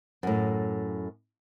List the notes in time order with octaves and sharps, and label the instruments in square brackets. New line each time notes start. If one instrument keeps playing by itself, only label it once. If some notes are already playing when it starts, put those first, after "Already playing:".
[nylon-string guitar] F#2 A2